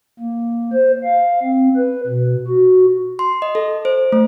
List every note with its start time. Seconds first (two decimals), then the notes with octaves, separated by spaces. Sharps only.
0.19 A#3
0.73 C5
1.03 F5
1.43 C4
1.76 B4
2.07 B2
2.47 F#4
3.19 C6
3.42 D#5
3.55 A4
3.85 C5
4.12 A3